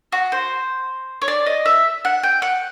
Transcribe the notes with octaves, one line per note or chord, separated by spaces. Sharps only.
F#4
C5
C#5
D5
D#5
E5
F#5
G5
F#5